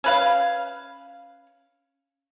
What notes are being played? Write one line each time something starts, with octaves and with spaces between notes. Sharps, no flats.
C#4 B4 F5